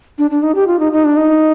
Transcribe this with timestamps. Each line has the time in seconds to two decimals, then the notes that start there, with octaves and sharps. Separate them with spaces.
0.18 D4
0.31 D4
0.43 D#4
0.55 G4
0.67 F4
0.79 D#4
0.93 D#4
1.05 D4
1.17 D#4